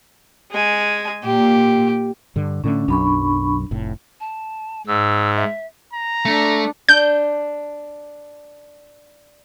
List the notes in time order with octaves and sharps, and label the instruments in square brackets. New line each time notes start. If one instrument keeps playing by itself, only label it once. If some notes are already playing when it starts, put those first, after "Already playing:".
[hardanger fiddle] G#3 G#5
[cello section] A#2 [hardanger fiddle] G4
[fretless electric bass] G2 D3
[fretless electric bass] A2 D3 A3 [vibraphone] C#4
[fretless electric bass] B1 F#2 [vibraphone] D4 B5 C#6
[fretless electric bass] F1 A2
[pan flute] A5
[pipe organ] G#2 [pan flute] E6
[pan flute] E5
[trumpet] A#5
[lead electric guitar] A3 [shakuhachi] D4
[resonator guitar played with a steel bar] D4 [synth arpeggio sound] G6